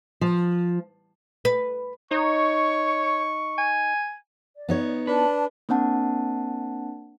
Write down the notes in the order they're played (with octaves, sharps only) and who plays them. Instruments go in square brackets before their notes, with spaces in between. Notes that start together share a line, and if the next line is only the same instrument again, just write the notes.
[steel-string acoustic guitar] F3
[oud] B4
[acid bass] D#4 [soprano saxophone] C#5 [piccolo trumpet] C#6
[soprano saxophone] G#5
[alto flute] D5
[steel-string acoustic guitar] B3 D#4 C#5
[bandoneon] D4 [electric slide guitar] B4 [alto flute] A5
[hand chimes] A#3 C4 D4 F#5 A5